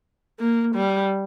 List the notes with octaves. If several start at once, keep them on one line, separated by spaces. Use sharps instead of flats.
A#3
G3